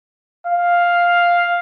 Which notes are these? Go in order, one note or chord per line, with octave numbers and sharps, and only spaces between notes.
F5